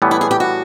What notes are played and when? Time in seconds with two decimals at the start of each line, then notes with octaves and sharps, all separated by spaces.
0.02 A2 E3 G3 B3
0.11 E4
0.21 G#4
0.31 G4
0.40 F#4